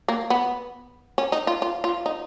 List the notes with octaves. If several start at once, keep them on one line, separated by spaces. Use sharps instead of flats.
A#3
B3
C#4
D#4
F4
F4
F4
D#4